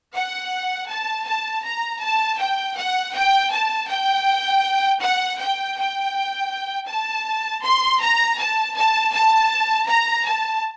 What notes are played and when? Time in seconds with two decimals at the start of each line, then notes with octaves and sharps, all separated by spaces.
0.14 F#5
0.89 A5
1.26 A5
1.64 A#5
2.01 A5
2.39 G5
2.77 F#5
3.14 G5
3.52 A5
3.89 G5
5.01 F#5
5.39 G5
5.77 G5
6.88 A5
7.64 C6
8.01 A#5
8.39 A5
8.76 A5
9.13 A5
9.88 A#5
10.25 A5